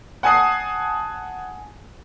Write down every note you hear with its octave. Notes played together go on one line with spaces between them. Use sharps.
F#5 G#5 A5 D#6 C7